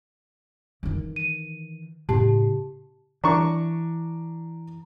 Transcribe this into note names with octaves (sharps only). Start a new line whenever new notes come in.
D#3 E3
D#7
A2 C#3 G4 A5
E3 D4 A#5 C#6